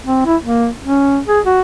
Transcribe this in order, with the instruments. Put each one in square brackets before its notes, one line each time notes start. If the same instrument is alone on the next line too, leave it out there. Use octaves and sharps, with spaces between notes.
[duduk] C4
E4
A#3
C#4
G#4
F#4